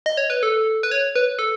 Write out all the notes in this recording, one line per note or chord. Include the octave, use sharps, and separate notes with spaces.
D#5
C#5
B4
A4
B4
C#5
B4
A4